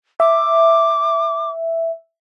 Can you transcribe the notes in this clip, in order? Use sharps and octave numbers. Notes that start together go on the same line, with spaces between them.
E5 D6